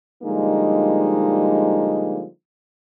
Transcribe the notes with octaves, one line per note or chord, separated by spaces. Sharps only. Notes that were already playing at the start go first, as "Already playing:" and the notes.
D3 F3 G3 G#3 A#3 D#4